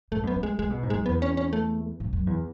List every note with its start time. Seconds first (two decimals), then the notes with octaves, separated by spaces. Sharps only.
0.12 G#2 A3
0.23 F#2 B3
0.36 E3
0.43 G#3
0.59 C#3 G#3
0.70 B2
0.83 G#2
0.90 G#3
0.94 F#2
1.06 E2 B3
1.22 C#4
1.37 C#4
1.53 A3
2.00 G#2
2.13 F#2
2.27 E2